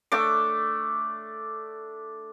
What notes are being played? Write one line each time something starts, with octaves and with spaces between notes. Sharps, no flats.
A3 D4 D6